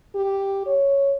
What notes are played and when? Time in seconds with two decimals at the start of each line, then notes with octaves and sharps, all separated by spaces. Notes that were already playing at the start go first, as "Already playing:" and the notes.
0.15 G4
0.66 C#5